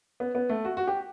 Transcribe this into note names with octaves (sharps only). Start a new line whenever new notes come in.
B3
B3
A3
F#4
F#4
G4